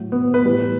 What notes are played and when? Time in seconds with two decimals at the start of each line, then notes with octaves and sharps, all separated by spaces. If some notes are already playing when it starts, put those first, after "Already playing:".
Already playing: A2 F#3
0.12 B3
0.34 B4
0.45 A2 E3 G3